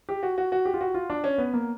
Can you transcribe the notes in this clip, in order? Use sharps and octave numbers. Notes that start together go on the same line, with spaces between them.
G4
F#4
F#4
F#4
G4
F4
F#4
F4
D4
C#4
B3
A#3